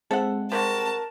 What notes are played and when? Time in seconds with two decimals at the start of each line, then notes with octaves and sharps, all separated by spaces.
0.11 G#3 C4 A4 E5 F#5
0.52 C3 G3 F#4 A#4 A5